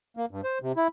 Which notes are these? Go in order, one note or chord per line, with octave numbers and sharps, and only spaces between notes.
A#3
G2
C5
C3
E4